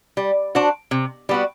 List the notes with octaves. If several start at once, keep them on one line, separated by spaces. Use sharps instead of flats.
G3
D4 F#4 C5
C3
G3 B3 F#4